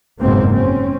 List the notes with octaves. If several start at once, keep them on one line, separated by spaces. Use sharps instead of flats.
F#1 F2 G#2 B2 A#3 C4
C4 C#4